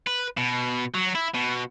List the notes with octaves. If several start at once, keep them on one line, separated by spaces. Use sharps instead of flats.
B4
B2
F#3
E4
B2